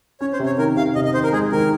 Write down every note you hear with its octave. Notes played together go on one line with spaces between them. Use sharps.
C#4 C#5
C5
C3
C#5
D#3 A#4
C3 F5
C3 D#5
D#5
D#3 C5
A#4
G#3 G#4
D#3 A#4